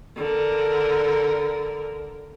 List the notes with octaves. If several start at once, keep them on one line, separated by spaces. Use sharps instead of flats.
D3 A#4